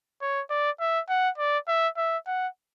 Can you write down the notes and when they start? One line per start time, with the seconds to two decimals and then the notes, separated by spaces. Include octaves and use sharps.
0.21 C#5
0.50 D5
0.80 E5
1.09 F#5
1.38 D5
1.67 E5
1.97 E5
2.27 F#5